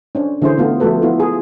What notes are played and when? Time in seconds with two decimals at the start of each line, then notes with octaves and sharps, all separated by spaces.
0.15 C#4 D4 C5
0.42 D3 E3 C#4 E4 G#4 C5
0.57 D3 A3 B3 F4
0.80 F3 A3 F#4 A4 B4
1.02 B3 E4 F4
1.20 G#4